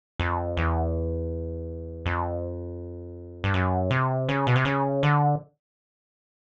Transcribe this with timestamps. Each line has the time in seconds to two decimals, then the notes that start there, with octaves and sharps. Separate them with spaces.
0.19 F2
0.57 E2
2.06 F2
3.44 G2
3.54 F#2
3.91 C3
4.29 C#3
4.47 B2
4.55 C3
4.65 C#3
5.03 D3